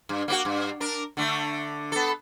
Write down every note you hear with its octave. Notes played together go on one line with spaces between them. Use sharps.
G2
A#3 B3 F#4
G2
D4 A#4
D3 A3
B3 A4